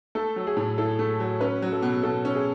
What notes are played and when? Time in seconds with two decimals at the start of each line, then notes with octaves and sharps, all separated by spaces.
0.15 A3 A4
0.36 F#3
0.47 G#4
0.57 A2
0.78 E4 A4
0.99 A3
1.20 F#3
1.41 C#4 B4
1.62 F#3
1.72 A4
1.82 B2
2.03 B2 A4
2.25 C#4
2.35 G#4